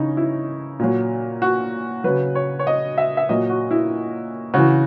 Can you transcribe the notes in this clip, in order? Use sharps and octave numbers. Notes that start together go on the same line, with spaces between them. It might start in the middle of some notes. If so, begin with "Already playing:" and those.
Already playing: C#3 E3 C#4 D#4
E4
A#2 F#3
F#4
C#3 F#3 B4
C#5
C#5
D#5
E5
E5
A#2 F#3 D#5
F#4
E4
C#3 E3 F#4